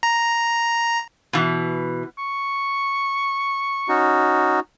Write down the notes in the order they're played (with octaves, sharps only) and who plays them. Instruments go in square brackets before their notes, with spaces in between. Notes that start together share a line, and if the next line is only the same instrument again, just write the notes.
[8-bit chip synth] A#5
[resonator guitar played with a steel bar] B2 E3
[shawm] C#6
[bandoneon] C#4 D#4 F#4